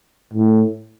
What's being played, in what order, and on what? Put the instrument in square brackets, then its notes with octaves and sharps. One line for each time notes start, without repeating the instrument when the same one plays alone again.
[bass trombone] A2